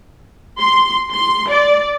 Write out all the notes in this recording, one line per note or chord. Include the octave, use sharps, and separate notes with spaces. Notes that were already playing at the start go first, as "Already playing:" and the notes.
C6
C6
D5